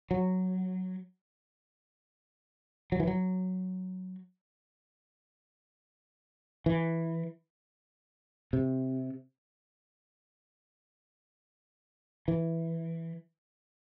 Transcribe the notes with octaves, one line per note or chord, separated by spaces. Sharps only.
F#3
F#3
E3
F#3
E3
C3
E3